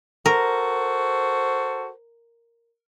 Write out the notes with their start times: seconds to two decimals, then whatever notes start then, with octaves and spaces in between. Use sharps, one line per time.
0.26 F#4 A4 A#4 C5